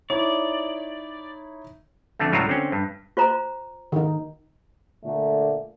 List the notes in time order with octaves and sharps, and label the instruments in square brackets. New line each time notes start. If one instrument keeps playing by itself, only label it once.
[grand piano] D#4 E4 C#5 [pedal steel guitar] D5
[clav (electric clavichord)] F2 D3 A3
C#2 A2 F#3 G3 F4 A#5
D3 C4 C#4
G2
[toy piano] F4 C5 A#5
[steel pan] D#3 D#4
[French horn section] A#2 D3 A3